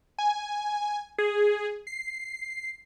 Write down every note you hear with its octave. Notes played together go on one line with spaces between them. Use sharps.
G#5
G#4
C7